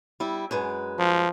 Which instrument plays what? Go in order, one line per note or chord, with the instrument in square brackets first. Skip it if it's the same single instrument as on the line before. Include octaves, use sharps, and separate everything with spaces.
[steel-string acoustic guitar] G3 E4
F#2 G#3 B4
[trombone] F3